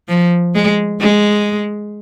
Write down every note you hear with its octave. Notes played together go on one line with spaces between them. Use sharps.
F3
G#3
G#3